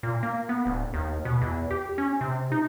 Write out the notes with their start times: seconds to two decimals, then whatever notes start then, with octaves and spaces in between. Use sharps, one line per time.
0.03 A#2
0.23 A#3
0.49 B3
0.66 D1
0.94 D#2
1.25 B2
1.42 E2
1.71 G4
1.98 C#4
2.21 C3
2.52 D#4